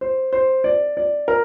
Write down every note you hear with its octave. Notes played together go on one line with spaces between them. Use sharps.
C5
C5
D5
D5
A#4